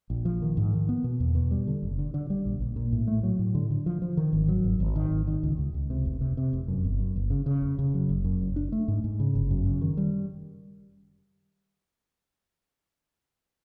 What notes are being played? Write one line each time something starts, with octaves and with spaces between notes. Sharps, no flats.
A#1
F3
D#3
G#2
D#3
B3
B2
E2
B2
G3
D3
F#1
D3
D3
G3
A#1
A#1
A#2
A2
A3
F#3
A2
D3
D3
F3
F3
D#3
G#1
F#3
G#1
G#1
D#3
G#1
D#3
C#2
C#2
C#2
C3
F1
C3
C3
F1
F#2
G1
F#2
G1
C#3
C#3
F1
C#3
F#3
F#1
F#2
F#1
D4
A3
G#2
G#2
C#3
G1
F#2
C#3
D#3
G3